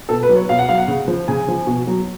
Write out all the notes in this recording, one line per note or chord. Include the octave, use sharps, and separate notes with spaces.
B2 A4
B4
F#3
C#5
B2 F5
F#5
F#3 F5
F#5
C#3
F3
C#3 G#5
F3
B2
F#3